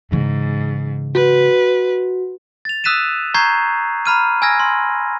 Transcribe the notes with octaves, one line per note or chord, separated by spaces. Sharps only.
G#2 C#3 E3
F#4 B4
A6 F7
D#6 E6 F#6 B6 D#7 E7
A#5 C#6 G6 G#6 C7
A#5 B5 F6 D#7
G#5 E6 F6 G#6 A#6
C6